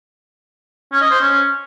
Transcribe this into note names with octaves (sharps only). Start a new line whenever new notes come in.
C#4
D#5
C5
C#4